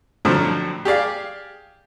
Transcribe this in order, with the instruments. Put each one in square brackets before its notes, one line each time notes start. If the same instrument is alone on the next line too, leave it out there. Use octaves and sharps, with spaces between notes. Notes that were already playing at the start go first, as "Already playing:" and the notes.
[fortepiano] F2 A2 D3 F3 F#3
G4 G#4 D5 F5